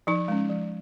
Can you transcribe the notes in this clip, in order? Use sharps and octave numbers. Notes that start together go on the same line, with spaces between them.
F3 D#4
G#3 C#4
F3